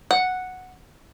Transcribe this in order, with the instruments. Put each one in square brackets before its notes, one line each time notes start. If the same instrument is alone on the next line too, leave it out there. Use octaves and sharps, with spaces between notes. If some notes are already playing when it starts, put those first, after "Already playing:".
[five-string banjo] F#5